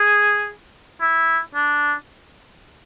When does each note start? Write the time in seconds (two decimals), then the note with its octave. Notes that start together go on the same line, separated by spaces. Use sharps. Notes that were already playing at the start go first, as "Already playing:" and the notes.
Already playing: G#4
1.01 E4
1.55 D4